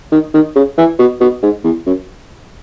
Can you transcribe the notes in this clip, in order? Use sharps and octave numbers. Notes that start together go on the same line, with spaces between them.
D#3
D#3
C#3
E3
B2
B2
G#2
E2
F#2